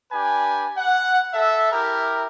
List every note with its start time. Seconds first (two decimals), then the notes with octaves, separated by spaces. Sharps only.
0.12 D4 G4 B4 G#5
0.77 F#5
1.33 A4 E5
1.73 E4 G4 A#4